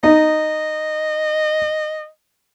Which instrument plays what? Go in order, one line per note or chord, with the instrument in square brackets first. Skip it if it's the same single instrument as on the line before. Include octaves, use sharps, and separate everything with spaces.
[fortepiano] D#4 [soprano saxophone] D#5